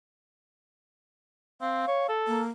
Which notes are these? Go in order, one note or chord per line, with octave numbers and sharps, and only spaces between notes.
C4 F5
C#5
A4
A#3